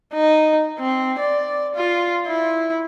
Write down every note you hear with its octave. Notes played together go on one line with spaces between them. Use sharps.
D#4
C4
D5
F4
E4